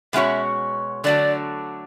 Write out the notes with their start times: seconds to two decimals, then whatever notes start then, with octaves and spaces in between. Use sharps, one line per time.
0.13 B2 G#3 C#4 F#4 C#5 E5
1.04 D3 F#3 A3 D4 F#4 D5